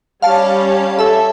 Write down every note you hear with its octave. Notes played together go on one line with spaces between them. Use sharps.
G3 C#4 F5 A5
A4 E5